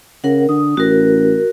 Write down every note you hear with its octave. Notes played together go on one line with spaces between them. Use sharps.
C#3 A#4 F#5
D3 D#6
A1 F#4 A#4